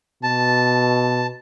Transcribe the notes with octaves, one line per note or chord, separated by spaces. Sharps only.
B2 A5